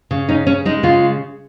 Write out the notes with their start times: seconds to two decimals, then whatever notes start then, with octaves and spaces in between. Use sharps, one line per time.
0.11 C#3
0.29 C#4 D#4
0.47 C#3 C#4
0.65 G#3 D#4
0.83 C#3 F4